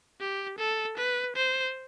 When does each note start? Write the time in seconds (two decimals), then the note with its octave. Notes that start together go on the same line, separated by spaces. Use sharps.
0.20 G4
0.58 A4
0.97 B4
1.36 C5